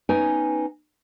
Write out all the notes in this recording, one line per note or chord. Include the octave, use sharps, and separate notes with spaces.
B3 C#4 D#4 B4 G5 G#5